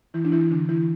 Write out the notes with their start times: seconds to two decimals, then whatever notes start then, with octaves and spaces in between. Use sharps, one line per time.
0.14 E3 E4
0.25 D4
0.32 E3 E4
0.51 D3 D4
0.69 E3 E4